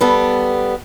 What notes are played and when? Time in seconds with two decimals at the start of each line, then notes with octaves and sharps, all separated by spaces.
0.01 G3 B3 A4